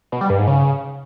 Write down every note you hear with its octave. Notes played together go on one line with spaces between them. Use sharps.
B2
G3
G2
G#2
C#3